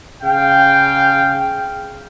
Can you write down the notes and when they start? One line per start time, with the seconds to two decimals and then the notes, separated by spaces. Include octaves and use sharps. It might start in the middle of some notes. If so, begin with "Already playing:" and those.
0.23 C#3 F5 G5